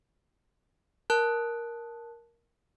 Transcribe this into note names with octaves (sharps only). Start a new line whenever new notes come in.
A#4 A5 F#6